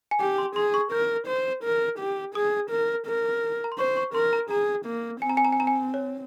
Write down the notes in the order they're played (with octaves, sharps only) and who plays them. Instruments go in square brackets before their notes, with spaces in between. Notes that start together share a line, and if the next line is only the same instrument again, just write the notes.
[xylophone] G#5
[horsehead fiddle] G4 [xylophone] G5
[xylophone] C6
[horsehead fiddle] G#4 [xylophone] C6
[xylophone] C#6
[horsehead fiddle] A#4 [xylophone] G6
[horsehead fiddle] C5
A#4
G4
[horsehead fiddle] G#4 [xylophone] D#6
[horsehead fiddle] A#4
A#4
[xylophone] A#5
C6
[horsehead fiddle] C5 [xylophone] C#6
[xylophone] C#6
[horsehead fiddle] A#4 [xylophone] C6
[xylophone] A#5
[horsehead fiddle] G#4 [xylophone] A#5
[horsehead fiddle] A#3
[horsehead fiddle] C4 [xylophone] G#5
[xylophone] A#5
G#5
A#5
G#5
A#5
G#5
C#5